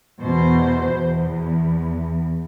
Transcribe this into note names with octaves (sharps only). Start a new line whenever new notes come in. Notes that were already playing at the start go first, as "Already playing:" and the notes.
E2 B2 C5
E2